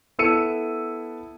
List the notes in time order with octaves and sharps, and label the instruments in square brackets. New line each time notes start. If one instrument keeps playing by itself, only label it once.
[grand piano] B3 E4 A4 E6 C#7 D#7